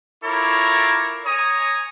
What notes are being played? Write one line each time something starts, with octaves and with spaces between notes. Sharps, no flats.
E4 F4 A4 A#4 C#5 D6
C#5 G#5 A#5 D#6